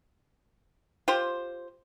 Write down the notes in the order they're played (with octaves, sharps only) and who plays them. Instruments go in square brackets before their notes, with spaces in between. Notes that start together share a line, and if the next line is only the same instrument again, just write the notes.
[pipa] F4 G4 C5